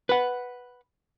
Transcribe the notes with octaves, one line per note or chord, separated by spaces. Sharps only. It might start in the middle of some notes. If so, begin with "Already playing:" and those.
B4 F#5